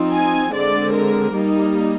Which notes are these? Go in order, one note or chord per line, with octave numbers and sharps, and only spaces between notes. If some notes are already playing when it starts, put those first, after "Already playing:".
Already playing: F3 C4 D#4
G#5
D3 G#3 C4 D5
A#4
G3 A#3 D#4